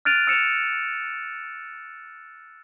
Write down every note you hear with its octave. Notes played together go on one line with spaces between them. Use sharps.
F6 F#6 A6 D7 D#7 F7
E6 C#7 E7 F7